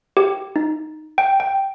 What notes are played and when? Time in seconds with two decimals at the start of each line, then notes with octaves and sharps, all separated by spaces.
0.17 G4
0.56 D#4
1.18 G5
1.40 G5